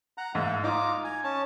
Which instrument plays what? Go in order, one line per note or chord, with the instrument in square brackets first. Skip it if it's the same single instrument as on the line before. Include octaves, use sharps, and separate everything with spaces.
[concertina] F#5 A#5
[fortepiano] G#2 [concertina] A#3 E5
[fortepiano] D#4 [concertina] F4 A#5 D6
[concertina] G#5
C#4 A5